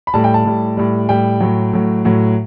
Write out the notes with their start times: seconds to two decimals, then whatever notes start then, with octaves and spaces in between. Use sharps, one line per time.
0.07 B5
0.14 A2 G3 A5
0.24 G5
0.34 A5
0.45 A2 G3
0.77 A2 G3
1.09 A2 G3 G5
1.40 A2 F#3
1.73 A2 F#3
2.05 A2 F#3